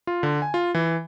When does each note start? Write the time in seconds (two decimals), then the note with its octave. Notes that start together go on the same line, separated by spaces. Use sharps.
0.07 F4
0.23 D3
0.42 G#5
0.54 F4
0.74 E3